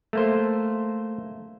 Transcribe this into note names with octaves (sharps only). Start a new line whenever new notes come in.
A3 A#3 C5